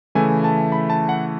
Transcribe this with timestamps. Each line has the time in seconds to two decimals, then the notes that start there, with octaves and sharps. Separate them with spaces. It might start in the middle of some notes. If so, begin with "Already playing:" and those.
0.15 C#3 E3 A3 E4 G#5
0.44 A5
0.72 B5
0.90 A5
1.09 F#5